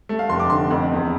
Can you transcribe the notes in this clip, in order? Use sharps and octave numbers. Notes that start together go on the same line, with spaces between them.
A3
F5
F1 C6
D6
D3 C6
F2
E2